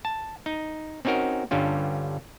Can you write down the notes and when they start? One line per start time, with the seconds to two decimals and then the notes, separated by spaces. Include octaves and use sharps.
0.05 A5
0.46 D#4
1.05 C4 C#4 D#4 F#4 A#4
1.51 G2 D3 G3 C#4 F4